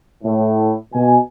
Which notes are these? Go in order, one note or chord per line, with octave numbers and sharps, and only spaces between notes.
A2
B2 G#5